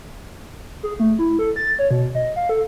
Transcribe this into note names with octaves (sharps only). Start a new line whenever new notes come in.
G#4
A3
E4
A4
A6
C#5
B2
D#5
F5
A4